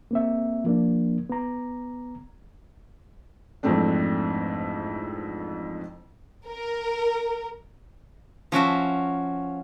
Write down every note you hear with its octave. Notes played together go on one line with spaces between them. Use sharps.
A#3 C4 E5
F3 A#3 D4
B3 A#5
F2 G#2 E3 A3 C4 D4
A#4
F3 C#4 F#4 E5